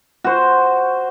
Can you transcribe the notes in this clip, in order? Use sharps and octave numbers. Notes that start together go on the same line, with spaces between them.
F#4 C5